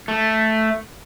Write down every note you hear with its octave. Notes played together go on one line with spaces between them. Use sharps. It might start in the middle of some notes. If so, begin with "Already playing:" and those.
A3